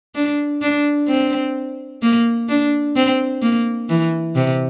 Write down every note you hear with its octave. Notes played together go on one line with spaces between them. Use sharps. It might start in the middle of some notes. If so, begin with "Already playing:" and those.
D4
D4
C4
A#3
D4
C4
A#3
E3
C3